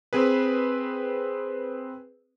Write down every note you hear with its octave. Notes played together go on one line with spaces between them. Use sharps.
C4 G#4 B4